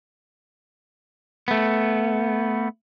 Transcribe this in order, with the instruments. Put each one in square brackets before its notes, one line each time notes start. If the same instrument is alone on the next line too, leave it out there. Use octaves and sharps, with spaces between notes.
[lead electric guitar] A3 B3